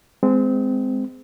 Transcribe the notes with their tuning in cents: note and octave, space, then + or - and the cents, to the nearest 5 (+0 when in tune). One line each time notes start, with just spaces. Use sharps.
G#3 +0 C4 -25